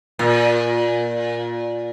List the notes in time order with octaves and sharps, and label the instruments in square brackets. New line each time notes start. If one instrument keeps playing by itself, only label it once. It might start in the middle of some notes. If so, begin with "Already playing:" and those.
[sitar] A#2